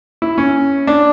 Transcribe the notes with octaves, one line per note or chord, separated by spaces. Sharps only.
E4
C#4
D4